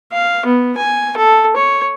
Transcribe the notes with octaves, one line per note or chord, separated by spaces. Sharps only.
F5
B3
G#5
A4
C#5